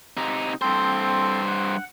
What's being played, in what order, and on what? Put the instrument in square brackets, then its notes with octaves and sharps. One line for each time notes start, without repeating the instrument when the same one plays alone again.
[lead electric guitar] C3 D#4
[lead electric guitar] G2 C5 [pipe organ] C4 A4
[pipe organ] F#5